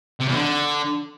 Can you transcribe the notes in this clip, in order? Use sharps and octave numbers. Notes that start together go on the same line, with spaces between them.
C3
E2
D3